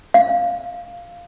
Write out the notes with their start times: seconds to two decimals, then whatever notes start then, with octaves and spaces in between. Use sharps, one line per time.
0.14 F5